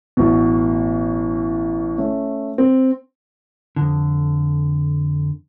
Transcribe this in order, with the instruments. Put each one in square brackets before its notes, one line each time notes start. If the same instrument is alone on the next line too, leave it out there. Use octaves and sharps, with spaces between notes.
[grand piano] A1 B2
A3 C#4
C4
[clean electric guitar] F2 D3